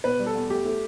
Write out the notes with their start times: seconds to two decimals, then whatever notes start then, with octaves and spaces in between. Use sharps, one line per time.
0.04 B2 B4
0.20 G3
0.27 A4
0.35 E2
0.50 A3 G4
0.65 A3